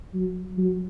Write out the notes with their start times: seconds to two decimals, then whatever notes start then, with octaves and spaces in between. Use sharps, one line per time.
0.14 F#3
0.57 F#3